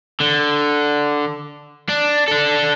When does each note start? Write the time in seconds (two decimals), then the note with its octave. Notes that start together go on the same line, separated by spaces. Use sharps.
0.20 D3
1.89 D4
2.28 D4 A4